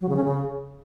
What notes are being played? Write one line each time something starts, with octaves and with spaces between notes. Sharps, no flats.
F#3
C#3
C#4
C#3